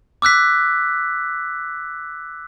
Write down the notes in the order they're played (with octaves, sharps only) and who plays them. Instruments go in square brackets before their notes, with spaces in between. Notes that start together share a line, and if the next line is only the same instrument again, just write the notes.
[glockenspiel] D6 E6 F#6 B6